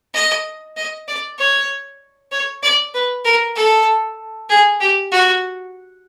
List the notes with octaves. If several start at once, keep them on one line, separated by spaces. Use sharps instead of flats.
D#5
D#5
D5
C#5
C#5
D5
B4
A#4
A4
G#4
G4
F#4